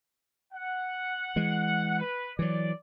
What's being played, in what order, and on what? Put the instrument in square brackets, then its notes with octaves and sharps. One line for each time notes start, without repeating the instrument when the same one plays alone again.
[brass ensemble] F#5
[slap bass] E3 G#3
[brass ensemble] B4
[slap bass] E3 F#3 [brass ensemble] D5